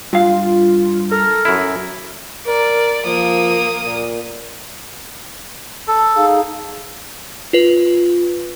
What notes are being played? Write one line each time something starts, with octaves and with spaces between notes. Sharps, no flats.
G2 F4 F5
A4 A#4
F#2 E4
A#4 D5
F3 A#3 D#6
A#2
A4
D#4 G#4 F5
F4 B4